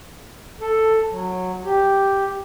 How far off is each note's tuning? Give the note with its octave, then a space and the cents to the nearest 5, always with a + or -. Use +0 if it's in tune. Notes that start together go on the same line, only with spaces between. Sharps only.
A4 +5
F#3 -10
G4 +0